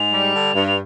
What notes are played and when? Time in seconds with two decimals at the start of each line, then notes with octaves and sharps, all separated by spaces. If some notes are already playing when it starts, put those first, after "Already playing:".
Already playing: G#2 F7
0.12 G3
0.34 D3
0.55 G2
0.68 F7